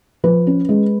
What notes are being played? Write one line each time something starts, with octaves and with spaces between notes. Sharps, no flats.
F3 B4
C#4
G#3